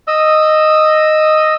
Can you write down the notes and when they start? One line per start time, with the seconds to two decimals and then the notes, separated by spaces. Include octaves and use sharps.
0.07 D#5 E6